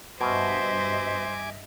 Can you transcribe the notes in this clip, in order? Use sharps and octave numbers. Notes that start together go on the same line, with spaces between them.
G2 B2 C5 D#5 E5 G#5 D6